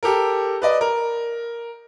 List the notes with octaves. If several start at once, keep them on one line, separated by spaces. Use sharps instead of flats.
G4 A4 A#4
B4 D5 D#5
A#4